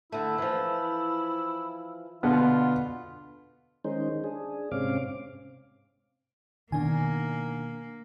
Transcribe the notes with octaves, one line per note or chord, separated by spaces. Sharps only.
D3 A3 E4
E3 F3
B2 D3 B3 F4
D#3 G#3 C#4 D#4 C5
D4 G#4
G#2 C3 C4 C#4 F5 D6
B2 D#3 A#3 D4 G#5